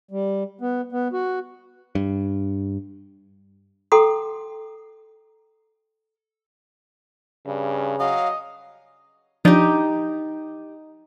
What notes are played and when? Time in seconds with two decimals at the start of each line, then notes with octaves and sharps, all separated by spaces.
0.11 G3
0.61 B3
0.92 B3
1.13 F#4
1.95 G2
3.92 A4 F#5 G5 A#5 C6 D#6
7.46 G2 C#3
7.99 F#3 D#5 F5
9.45 F3 D4 D#4 G4 D5